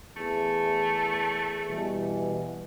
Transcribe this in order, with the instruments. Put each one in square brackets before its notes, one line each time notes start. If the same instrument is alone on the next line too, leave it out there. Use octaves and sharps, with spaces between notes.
[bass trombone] E2 [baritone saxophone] A3
[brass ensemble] B2 E3 G3